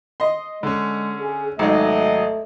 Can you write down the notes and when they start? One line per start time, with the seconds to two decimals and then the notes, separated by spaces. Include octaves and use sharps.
0.20 D#5 C6
0.63 D3 G#3 C#4
1.21 G#4
1.59 G#1 G#2 F#3 A3 D#4 D#5